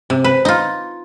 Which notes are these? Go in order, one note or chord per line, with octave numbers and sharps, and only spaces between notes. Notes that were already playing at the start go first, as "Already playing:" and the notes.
C3
B4
D#4 F4